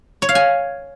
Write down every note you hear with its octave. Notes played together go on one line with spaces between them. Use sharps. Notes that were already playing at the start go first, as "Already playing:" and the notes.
C#5
F5
G#5